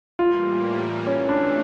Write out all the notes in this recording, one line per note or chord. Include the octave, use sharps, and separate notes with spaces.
A2 E3 G3 A#3 F4
C3 E3 A3 C#4
D4